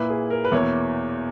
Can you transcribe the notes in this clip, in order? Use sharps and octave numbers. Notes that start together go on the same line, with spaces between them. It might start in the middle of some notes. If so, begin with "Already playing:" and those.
Already playing: A#2 A#3 E4 B4
G#4
A#4
B4
E2 B2 A#3 E4 C#5